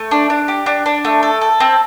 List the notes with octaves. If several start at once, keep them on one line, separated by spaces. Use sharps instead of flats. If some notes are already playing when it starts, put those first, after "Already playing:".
Already playing: A3
D4
D4
G4
D4
D4
A3
A4
A4
C4